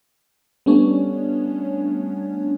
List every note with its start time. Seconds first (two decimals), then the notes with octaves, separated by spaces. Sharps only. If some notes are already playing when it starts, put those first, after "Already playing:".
0.66 G3 A3 B3 C#4 D4 C#5